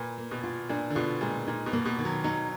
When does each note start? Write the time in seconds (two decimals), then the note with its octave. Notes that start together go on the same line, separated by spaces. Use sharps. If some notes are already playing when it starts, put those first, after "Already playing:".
Already playing: A#2 B4
0.18 A#3
0.31 B2
0.43 F4
0.69 A#2 D4
0.90 D3
0.96 B2 F4
1.21 A#2 G#3
1.47 A#2 D#4
1.66 B2
1.73 A#3
1.85 B2
1.99 D#3
2.05 F#3
2.24 F#3 D#4